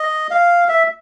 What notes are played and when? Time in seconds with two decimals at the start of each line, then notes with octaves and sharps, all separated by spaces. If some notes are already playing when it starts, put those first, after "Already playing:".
Already playing: D#5
0.31 F5
0.69 E5